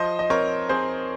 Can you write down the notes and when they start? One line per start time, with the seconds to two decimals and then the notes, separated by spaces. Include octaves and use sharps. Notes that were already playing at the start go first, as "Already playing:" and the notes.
Already playing: F3 C5 D#5
0.19 D#5
0.30 C4 A#4 C#5
0.69 C4 G#4 C5